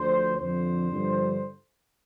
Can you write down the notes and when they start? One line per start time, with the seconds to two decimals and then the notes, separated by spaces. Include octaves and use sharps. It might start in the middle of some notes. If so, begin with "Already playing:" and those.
Already playing: D2 D3 F3 C5
0.36 F2 D3 F3 C5
0.89 G2 D3 F3